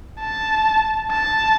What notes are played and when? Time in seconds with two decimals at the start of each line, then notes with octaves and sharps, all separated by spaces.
0.20 A5
1.11 A5